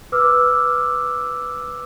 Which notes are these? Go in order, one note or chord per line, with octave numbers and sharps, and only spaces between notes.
B4 D6 E6 F6